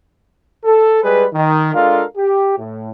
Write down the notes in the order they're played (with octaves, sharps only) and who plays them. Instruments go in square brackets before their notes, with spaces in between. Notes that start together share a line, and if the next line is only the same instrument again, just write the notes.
[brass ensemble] A4
G3 G#3 G#4 B4
D#3
G#3 D4 F4 A4 A#4 F5
G4
A2